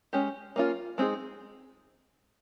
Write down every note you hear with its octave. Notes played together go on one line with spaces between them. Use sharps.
G#3 C#4 G4
A#3 C#4 F4
G#3 C4 D#4 G#4